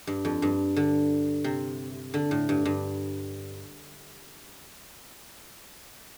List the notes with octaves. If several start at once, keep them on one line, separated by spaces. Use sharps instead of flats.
G2
F2
G2
D3
C3
D3
A2
G2
G2